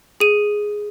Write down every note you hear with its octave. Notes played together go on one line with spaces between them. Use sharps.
G#4 D#7